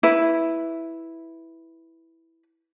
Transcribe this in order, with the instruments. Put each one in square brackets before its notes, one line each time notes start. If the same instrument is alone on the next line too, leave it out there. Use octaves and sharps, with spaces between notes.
[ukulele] E4 B4